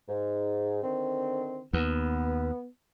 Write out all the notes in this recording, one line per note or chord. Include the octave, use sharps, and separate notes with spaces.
G#2
D3 D#3 C4
D#2 B3